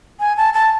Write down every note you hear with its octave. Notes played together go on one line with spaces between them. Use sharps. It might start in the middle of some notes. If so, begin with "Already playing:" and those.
G#5
A5
A5